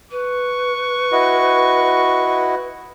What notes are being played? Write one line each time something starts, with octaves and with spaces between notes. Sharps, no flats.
B4 C#6
E4 F#4 D#5